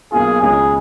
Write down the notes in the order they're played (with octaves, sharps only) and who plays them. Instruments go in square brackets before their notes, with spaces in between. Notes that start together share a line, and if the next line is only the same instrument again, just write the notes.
[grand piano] B1 B2 A#3 F4 [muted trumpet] G#4
[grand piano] C#2 C#3 G#3 C#4 [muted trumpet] G#4